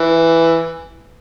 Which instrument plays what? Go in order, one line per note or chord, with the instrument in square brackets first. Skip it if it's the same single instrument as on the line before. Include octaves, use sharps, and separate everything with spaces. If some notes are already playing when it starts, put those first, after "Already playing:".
Already playing: [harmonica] E3